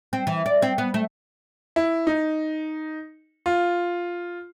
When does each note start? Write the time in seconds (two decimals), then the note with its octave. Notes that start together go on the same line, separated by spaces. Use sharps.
0.13 C4
0.27 E3
0.46 D5
0.62 C4
0.78 B3
0.94 A3
1.76 E4
2.07 D#4
3.46 F4